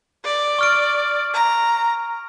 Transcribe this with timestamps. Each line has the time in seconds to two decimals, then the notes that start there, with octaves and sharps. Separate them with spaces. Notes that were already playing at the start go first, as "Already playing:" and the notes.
0.25 D5
0.59 C#6 F6 D7
1.34 A#5